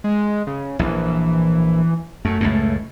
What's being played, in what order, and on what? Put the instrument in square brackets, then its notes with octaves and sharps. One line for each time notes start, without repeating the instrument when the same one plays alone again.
[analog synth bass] G#3
C#3
[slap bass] A#1 [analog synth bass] E3
[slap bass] F#2 [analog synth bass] A3
[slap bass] C#2 F#2 A2